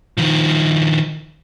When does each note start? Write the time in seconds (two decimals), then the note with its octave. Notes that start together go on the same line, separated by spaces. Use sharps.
0.18 D#3 F3